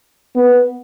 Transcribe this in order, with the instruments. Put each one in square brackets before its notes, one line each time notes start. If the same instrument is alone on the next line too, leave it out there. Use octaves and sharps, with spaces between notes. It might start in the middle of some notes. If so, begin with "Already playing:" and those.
[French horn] B3